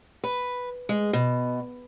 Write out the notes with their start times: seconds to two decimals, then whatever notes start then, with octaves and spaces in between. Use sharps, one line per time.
0.24 B4
0.89 G#3
1.13 B2